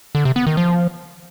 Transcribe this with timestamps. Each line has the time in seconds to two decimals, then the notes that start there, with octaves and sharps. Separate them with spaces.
0.15 D3
0.25 C3
0.36 B3
0.47 D#3
0.57 F3